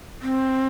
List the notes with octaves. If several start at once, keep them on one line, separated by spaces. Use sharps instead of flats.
C4